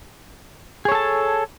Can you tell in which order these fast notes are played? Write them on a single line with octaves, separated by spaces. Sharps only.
G#4 C#5 A4 A5